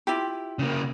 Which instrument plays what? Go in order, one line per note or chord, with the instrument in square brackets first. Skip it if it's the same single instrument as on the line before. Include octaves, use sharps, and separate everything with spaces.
[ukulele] E4 F4 G4
[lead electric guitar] C#3 A#3